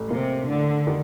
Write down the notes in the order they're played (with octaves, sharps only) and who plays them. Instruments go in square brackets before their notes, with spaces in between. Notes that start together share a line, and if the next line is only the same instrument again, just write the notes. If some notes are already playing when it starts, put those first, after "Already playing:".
Already playing: [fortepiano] A1
[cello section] C3 [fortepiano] A#3
[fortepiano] A2 [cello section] D3
[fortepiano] D#3